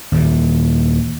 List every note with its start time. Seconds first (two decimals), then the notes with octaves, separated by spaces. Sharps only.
0.12 D#2 A#2 E3